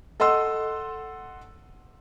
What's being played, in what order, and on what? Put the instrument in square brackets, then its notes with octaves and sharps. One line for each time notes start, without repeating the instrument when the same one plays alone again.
[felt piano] A4 D#5 F#5 C6 E6